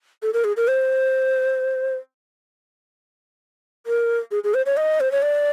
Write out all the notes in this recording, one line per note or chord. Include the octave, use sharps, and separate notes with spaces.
A4
A#4
G#4
A#4
C5
A#4
G#4
G#4
C5
C#5
D#5
C5
C#5
D5